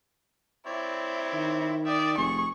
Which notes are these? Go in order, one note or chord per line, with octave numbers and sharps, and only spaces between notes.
C4 E4 C#5 D5
D#3
D5 E5 G5 D#6
F1 G#4 C#6